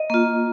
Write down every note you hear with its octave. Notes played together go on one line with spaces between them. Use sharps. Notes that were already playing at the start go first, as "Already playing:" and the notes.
Already playing: D#5
A#3 F4